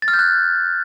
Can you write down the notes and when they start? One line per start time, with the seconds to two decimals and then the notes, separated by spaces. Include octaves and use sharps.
0.02 A6
0.08 F6
0.13 G6
0.19 F#6